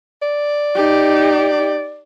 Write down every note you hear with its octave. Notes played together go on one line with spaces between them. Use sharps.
D5
D#4 G4